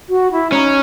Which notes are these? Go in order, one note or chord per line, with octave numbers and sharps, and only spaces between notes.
F#4
E4
C#4 D#4